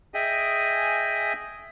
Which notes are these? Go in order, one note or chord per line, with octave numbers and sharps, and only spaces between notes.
G#4 D#5 E5 G5 G#5